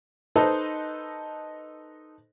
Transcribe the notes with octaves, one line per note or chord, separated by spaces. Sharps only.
D#4 A4 B4 C5 D#5